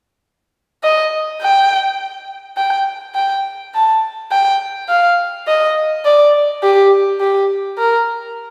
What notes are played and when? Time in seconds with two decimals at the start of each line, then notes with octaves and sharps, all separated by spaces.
0.83 D#5
1.41 G5
2.57 G5
3.15 G5
3.74 A5
4.31 G5
4.89 F5
5.47 D#5
6.05 D5
6.63 G4
7.21 G4
7.78 A#4